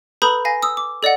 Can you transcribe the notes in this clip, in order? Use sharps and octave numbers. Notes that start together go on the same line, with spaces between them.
A4 B4 A#5 B5 D#6 G6
F5 G#5 A#6
D#6 E6
D6
A4 D5 D#5 F#5